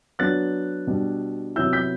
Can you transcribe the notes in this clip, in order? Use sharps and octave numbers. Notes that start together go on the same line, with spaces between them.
F#3 B3 D4 F#6 A6
B2 G3 D4
C3 F#3 B3 E4 E6 G6
G6 B6